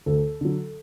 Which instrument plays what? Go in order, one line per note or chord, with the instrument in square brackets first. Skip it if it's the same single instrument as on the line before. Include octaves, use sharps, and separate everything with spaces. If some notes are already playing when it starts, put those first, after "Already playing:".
[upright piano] D2 A4
D3 F#3